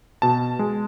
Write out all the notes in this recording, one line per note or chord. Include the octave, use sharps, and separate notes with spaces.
B2 A5
G#3